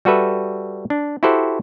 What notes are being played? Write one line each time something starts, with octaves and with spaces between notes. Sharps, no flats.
G3 F#4 A4 B4 E5
D4
E4 F#4 G4 A4 C5 F#5